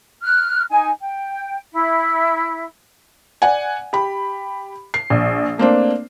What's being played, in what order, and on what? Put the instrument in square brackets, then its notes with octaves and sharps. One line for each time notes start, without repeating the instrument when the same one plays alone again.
[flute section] F6 F#6
D#4 G#5
G5
E4
[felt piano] D5 F#5 G#5
G4 B5
C7
A#1
A3 A#3 C4 D4